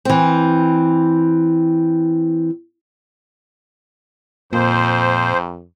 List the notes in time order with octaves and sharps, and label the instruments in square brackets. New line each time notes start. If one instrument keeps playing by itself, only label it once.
[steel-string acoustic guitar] E3 C4
[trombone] F2 [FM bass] A#2 [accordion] C5